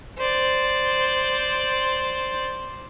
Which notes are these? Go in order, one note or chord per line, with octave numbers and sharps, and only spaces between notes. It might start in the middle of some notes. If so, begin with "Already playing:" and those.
C5 D5